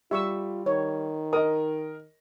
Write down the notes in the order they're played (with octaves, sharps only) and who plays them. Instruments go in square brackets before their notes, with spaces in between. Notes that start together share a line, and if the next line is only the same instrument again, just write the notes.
[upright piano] G3 [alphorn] F4 [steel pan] E5 C#6 E6
[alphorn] D#3 [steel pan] C#5
[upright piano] A#4 D#5 [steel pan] D#6